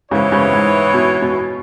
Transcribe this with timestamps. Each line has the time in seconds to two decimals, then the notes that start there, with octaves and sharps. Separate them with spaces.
0.11 G#2 C#3 E3 B3 E4 C#5
0.32 G#2 C#3
0.53 G#2
0.94 B2
1.22 B2